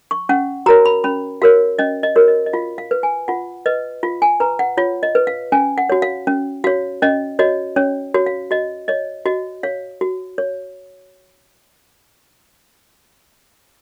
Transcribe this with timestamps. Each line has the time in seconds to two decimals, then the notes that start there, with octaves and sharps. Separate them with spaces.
0.11 C#6
0.29 C#4 F#5
0.66 F#4 A#4 C#5 A#5
0.86 B5
1.04 C#4 B5
1.42 F#4 A#4 C#5 F5
1.79 C#4 D#5
2.03 D#5
2.16 F#4 A#4 C#5
2.28 D#5
2.46 D#5
2.53 F4 F5
2.78 F5
2.91 B4
3.03 G#5
3.28 F4 F#5
3.66 B4 D#5
4.03 F4 F5
4.22 G#5
4.40 B4 A#5
4.59 F#5
4.77 F4 C#5
5.03 D#5
5.15 B4
5.27 F5
5.52 C#4 G#5
5.78 F#5
5.90 F#4 C#5
6.02 F5
6.27 C#4
6.64 F#4 C#5 F5
7.02 C#4 D#5
7.39 F#4 C#5 D#5
7.76 C#4 C#5
8.14 F#4 C#5
8.26 F5
8.51 F#4 D#5
8.88 C#5 D#5
9.26 F#4 D#5
9.63 C#5 F5
10.01 F#4
10.38 C#5